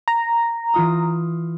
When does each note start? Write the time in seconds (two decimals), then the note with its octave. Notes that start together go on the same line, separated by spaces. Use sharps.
0.08 A#5
0.74 E3 F4 D#6